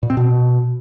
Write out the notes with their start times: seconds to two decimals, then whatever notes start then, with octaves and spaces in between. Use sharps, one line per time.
0.03 A#2
0.10 C4
0.17 B2